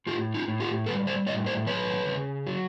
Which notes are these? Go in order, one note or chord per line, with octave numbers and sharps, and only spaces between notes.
A2 F4 G4
D#4 F4
A2
F4 G4
G3 A4 B4
C5 D5
A2 C#5 D#5
C5 D5
F#3 B4 C#5
C#3
F#3